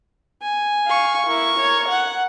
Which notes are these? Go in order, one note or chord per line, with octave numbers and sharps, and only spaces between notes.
G#5
F5 C#6
E4 A#4 C#6
C#5
F#5